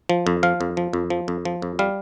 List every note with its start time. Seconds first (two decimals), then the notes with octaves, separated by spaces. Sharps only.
0.09 F3
0.27 F2
0.43 F3 F5
0.61 F2
0.77 F3
0.93 F2
1.10 F3
1.28 F2
1.45 F3
1.62 F2
1.79 G3 F5